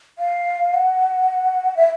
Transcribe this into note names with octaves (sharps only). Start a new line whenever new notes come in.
F5
F#5
E5